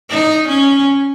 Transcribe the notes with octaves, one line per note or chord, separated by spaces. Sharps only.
D#4
C#4